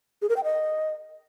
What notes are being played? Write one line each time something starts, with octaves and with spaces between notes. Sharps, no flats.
G#4
A#4
G5
D#5